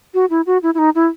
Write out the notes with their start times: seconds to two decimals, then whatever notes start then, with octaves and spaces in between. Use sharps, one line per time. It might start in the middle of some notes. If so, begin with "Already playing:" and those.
0.14 F#4
0.30 E4
0.47 F#4
0.63 E4
0.74 E4
0.78 D#4
0.95 E4